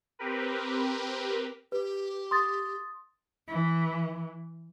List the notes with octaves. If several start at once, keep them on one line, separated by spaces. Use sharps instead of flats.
C4 G4 A#4 B4
G4 B4
C6 D#6 A6
E3